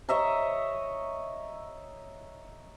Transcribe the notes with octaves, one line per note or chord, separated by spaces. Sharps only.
C#5 D#5 E5 A#5